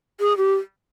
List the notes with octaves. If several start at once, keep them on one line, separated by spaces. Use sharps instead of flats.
G#4
G4